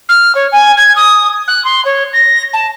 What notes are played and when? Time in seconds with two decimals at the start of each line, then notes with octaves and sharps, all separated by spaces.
0.09 F6
0.35 C#5
0.52 G#5
0.77 G#6
0.96 D#6
1.48 F#6
1.65 C6
1.85 C#5
2.13 A#6
2.53 A5